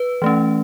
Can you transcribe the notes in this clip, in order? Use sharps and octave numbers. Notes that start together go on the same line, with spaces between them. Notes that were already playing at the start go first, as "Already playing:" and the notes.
Already playing: B4
E3 A3 C#4